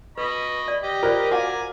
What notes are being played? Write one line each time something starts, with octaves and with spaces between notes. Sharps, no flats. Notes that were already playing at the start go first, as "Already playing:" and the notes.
B4 D#5 B5 C#6
D5
G4 D#5
F4 A#4 C5 D5
F#4 F5 F#5 G#5 A#5 D6